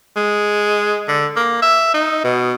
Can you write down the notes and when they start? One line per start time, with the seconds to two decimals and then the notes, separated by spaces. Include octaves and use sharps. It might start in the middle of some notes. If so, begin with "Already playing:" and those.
0.16 G#3
1.08 D3
1.36 A#3
1.62 E5
1.94 D#4
2.24 B2